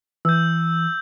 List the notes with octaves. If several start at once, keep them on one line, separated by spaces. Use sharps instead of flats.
E3 E6 G6